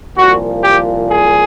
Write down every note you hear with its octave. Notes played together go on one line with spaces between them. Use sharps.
C2 A#2 F3 F#4
G4
G#4